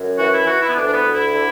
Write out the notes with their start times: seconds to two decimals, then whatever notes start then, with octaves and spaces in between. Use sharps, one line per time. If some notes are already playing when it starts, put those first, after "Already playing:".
Already playing: F#2
0.18 E3 F#4
0.32 E4
0.46 E3 F#4
0.61 E4
0.68 B3
0.75 D2 D4
0.87 D4
0.94 B3
1.04 D2
1.14 E4
1.33 D3